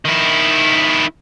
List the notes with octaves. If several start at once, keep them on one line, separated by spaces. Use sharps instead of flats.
D#3 E4